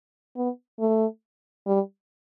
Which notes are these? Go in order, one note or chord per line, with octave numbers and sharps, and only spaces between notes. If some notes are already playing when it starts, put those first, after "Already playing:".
B3
A3
G3